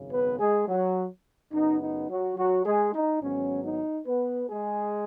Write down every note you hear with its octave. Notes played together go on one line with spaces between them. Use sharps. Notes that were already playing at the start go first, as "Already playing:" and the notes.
Already playing: G#1 F#2 C#3
B3 B4
G#3 G#4
F#3 F#4
F#2 C#3 B3 D#4
D#4
F#3 F#4
F#3 F#4
G#3 G#4
D#4
G#1 G#2 F#3 B3 C#4
D#4
B3 B4
G#3 G#4